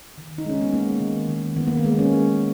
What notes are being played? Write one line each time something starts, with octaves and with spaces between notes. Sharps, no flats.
D#3
D#4
G#3 C#4
B3
G#3 A#3
D#3
D#3
D#3 B3
A#3
B3
G#3
B3
C#4
G#3